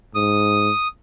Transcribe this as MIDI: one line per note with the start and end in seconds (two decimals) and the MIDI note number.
0.15 0.70 44
0.15 0.88 87